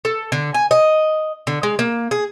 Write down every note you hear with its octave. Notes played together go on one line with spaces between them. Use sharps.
A4
D3
G#5
D#5
D3
G#3
A#3
G#4